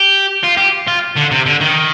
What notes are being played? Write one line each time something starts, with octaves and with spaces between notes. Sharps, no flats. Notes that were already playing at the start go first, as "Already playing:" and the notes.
Already playing: G4
F4
G4
F4
D3
C3
D3
D#3